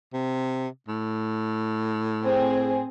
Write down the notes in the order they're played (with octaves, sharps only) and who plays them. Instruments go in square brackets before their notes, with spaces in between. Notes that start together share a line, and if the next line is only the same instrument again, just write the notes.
[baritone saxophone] C3
A2
[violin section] C4 G#4